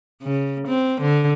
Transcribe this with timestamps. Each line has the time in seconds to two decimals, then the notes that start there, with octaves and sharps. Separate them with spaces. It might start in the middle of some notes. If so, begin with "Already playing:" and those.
0.23 C#3
0.68 C4
1.02 D3